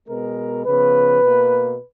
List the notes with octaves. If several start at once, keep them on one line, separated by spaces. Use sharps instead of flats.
B2 G#3 B3 A#4
C#3 F3 B3 B4
B2 A#3